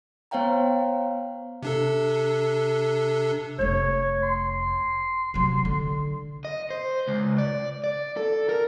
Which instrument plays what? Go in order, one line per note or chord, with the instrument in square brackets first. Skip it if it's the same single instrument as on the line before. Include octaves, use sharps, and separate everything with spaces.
[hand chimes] B3 C5 C#5 F5 G5 A#5
[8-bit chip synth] C3 D4 A4
[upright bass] F1 A3 [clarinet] C#5
[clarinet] C6
[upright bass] C3 F#3
D3
[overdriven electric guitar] D#5
C5
C#2
D5
D5
A4
A#4